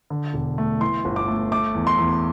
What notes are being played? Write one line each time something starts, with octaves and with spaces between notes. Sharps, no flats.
D3
E1
A3
E3 C6
G1
D6
A3
A3 D6
E2
C6
E2